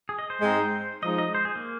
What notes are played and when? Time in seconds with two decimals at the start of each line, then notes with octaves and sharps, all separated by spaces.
0.09 G#4
0.19 D#5
0.30 C5
0.40 G#2 G#3 C4 D#4
1.03 F3 G#3 D#4 D#5
1.18 D#5
1.35 C5
1.45 G#4
1.55 A#3